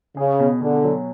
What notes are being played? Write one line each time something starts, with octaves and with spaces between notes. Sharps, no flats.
C#3 G#4
B2
B2 D3
F#3